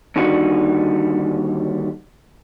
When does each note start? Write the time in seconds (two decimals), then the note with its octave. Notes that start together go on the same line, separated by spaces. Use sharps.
0.16 D#2 D3 G3 D#4 F#4